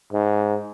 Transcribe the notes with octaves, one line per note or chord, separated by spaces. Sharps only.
G#2